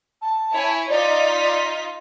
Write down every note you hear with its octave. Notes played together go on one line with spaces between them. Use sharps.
A5
E4 C#5 G#5
D#4 F4 D5 B6